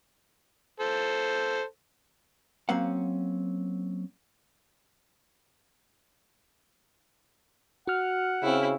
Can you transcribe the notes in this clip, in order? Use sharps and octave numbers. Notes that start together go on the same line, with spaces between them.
A4 C5
F#3 A#3 C4 C#4 F5 F#5
F#4 F#5 F6
C#3 C4 E4